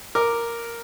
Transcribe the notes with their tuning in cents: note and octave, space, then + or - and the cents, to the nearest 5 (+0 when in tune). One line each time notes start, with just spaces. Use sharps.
A#4 +0 D6 +5